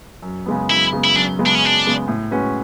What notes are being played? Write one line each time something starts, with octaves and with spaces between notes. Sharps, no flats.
F#2
C#3 G#3 B3
F#2 E4
C#3 G#3 B3
E4
F#2 D4
C#3 G#3 B3
D4
C#4
F#2 D4
C#3 G#3 B3
A2
G#3 C#4 F#4 B4